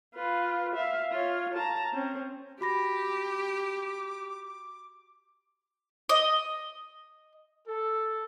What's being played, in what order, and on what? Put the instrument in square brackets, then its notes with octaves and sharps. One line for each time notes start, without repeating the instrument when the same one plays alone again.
[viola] F4 B4
E5 F5
F4 C#5
A5 A#5
C4 C#4
[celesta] F#4 B5 A#6 [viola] G4 [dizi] D6
[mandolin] D#5
[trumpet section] A4